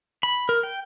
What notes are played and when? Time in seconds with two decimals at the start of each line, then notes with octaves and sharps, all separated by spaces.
0.23 B5
0.49 A#4
0.63 G5